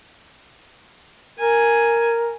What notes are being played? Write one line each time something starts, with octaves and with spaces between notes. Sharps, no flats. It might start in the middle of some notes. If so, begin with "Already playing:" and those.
A#4 G#5